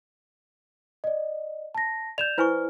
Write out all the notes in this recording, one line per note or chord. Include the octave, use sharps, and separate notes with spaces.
D5 D#5
A5 A#6
D5 G6 E7 F7
E4 B4 C5 G#5 C#6 F6